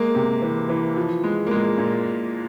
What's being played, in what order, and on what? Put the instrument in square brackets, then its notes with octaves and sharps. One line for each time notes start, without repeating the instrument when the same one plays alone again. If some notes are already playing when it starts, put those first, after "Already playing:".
Already playing: [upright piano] G#3 A#3
C3
E3
E3
F3
G#3
A#3
A#2 G#3
A#2